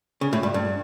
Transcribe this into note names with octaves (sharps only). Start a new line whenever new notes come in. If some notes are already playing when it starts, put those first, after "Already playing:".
C#3
A2
G2
G2